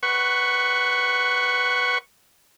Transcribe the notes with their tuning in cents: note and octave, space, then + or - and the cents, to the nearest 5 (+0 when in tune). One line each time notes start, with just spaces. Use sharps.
B4 +0 F#5 +20 C#6 +0